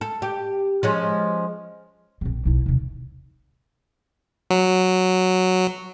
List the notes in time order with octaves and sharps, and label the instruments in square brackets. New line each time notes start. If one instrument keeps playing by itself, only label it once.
[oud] A4
G4
F3 G#3 C#4
[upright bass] A#1 C4
B1 E4
D#2 C3
[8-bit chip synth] F#3